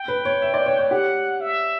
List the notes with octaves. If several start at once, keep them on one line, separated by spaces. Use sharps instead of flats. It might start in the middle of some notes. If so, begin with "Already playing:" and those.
Already playing: G5
B4
C#5
E5
D5
C#5
C#5
G4 F#5
E5